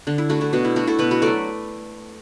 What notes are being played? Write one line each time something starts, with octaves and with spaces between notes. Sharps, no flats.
D3 D4
E4
A3 D4 F#4
E4 A4
B2 D4 F#4
E4
A3 D4 F#4
E4 A4
B2 F#4 B4
F#4 B4
F#3 A3 A4 D5